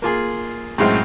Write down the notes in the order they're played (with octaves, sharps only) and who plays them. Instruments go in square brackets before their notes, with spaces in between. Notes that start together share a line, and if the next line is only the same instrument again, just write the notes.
[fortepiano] A#3 F4 G#4
[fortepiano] F#2 C6 F6 [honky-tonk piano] A2 G#3 C4